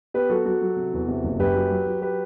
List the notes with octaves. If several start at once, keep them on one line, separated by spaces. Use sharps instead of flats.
B3 G4 B4
F#3 F#4 A4
F#3 F#4 A4
F#3
C3
E2
C3
F#1
F#2 G4 B4
F#3
F#3
F#3
G4 B4